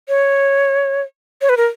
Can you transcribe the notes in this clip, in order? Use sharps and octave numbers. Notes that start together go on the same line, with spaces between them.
C#5
C#5
B4
A#4